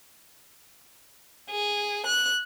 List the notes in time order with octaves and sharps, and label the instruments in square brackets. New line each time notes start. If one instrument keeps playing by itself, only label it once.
[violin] G#4
F#6